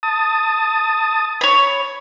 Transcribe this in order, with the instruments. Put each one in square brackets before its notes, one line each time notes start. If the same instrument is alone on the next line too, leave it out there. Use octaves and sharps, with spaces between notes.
[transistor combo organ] A5 D#6
[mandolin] C#5 B5